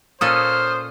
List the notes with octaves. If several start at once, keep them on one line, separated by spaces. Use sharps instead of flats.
A#2 C#4 A4 C5 D#6 F6